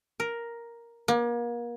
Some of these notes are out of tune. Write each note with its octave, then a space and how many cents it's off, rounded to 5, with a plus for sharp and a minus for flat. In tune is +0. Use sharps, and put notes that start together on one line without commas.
A#4 +5
A#3 +35